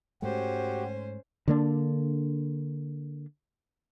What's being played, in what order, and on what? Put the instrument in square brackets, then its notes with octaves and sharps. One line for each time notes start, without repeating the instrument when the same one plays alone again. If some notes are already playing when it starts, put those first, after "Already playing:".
[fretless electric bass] G#2 G#3 A3 [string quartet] C#4 C5 [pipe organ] F#4 G4
[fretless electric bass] D3 A#3 D4